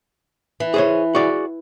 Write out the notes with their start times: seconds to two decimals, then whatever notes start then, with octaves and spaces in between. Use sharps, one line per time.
0.60 E3
0.74 G#4 C5 C#5
1.15 F#4 G#4 D5